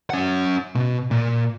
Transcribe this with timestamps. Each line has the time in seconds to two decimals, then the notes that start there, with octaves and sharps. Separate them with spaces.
0.10 C#4 F#5
0.75 B2
1.11 A#2